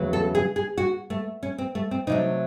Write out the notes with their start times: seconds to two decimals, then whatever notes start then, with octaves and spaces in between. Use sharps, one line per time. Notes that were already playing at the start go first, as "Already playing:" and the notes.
Already playing: E2 C#3 F#3 A3
0.13 A4
0.35 G#4
0.56 G#4
0.78 F#4
1.10 A3
1.43 C#4
1.58 C4
1.75 A3
1.91 C4
2.07 C3 F#3 A3 D#4